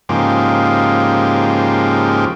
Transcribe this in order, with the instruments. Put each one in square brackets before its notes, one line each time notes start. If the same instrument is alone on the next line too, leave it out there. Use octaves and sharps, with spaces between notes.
[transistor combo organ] G#2 C#3 F3 A#3 G4